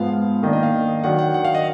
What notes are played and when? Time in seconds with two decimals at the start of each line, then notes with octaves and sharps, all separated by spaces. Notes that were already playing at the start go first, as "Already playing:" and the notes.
Already playing: G#2 F3 B3 F5
0.13 F5
0.43 D#3 A#3 D4 D#5
0.53 D#5
0.63 F5
1.04 D#3 F#3 D4 F#5
1.19 F#5
1.34 F#5
1.45 F5
1.55 D#5